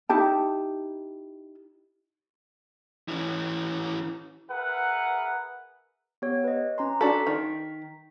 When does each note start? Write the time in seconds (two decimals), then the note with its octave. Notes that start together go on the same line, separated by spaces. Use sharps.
0.09 D#4 E4 G4 A5
3.08 E3 C#4
4.50 G#4 A#4 B4 E5 F#5
6.22 B3 G4 C#5
6.44 B4 D#5
6.78 C#4 A#5 C6
7.01 D4 F#4 A4 B6
7.27 D#3